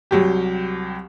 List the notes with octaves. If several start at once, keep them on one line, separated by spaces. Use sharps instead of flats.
C2 F#3 G4